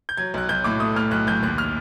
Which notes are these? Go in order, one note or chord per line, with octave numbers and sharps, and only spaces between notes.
G6
F#3 G#6
B1 F#6
B1 G6
A2 D6
A3 D#6
A2 F6
B1 F#6
B1 G6
D#2 F#6
F6